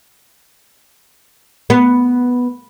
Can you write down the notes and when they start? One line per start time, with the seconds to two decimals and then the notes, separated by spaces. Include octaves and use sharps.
1.70 B3